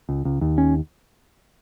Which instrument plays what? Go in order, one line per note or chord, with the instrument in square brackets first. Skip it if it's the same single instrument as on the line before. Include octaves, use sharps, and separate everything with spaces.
[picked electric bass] C#2
C#2
D#2
C#4